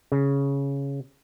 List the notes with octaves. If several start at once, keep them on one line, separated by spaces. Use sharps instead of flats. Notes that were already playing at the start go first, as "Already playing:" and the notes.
C#3